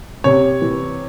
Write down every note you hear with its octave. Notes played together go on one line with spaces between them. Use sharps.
C3 C#5
E3